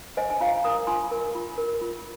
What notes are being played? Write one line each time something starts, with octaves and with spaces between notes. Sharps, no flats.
C5 D#5 G#5
G#5
F4 F5 A#5
A#4 A#5 D#6
F4 G#5 C6
A#4
F4
A#4
F4